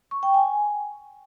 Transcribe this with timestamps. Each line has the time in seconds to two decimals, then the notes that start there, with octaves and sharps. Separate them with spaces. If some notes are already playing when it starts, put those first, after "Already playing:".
0.11 C#6
0.23 G5
0.34 G#5